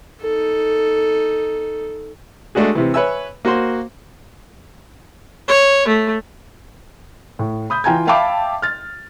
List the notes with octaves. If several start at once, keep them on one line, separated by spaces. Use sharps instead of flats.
D#4 A4
G#3 A3 D4 F#4 G#4
C3 E3
B4 C#5 E5 G#5 E6
A#3 F#4 C5 C6
C#5
A3
A2
B5 D#6 G6
E3 F4 G5 G#5 A#5 G#6
E5 F5 G5 A5 B5 D6
F6 A6